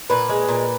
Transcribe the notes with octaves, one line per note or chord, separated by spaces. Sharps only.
A#2 B4
G#3
A#2